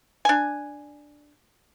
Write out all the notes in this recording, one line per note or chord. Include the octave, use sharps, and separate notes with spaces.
D4 G#5